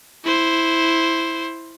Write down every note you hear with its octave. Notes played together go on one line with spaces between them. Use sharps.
E4 C5